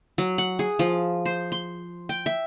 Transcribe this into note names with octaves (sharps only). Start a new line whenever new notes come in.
F#3
F#5
G#4
F3
C5
C6
G5
E5